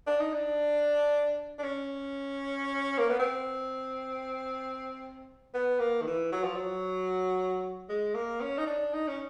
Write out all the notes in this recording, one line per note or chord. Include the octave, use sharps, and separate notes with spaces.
D4
D#4
D4
D4
C#4
A#3
B3
C4
B3
A#3
D#3
E3
F#3
F3
F#3
G#3
A#3
C#4
D#4
D4
D#4
C#4